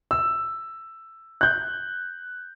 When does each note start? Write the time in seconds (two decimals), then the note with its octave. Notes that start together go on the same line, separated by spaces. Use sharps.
0.11 E6
1.41 F#6 G6